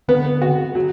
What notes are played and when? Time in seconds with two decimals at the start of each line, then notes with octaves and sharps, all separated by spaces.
0.08 D3 B3
0.42 F#4
0.75 F#3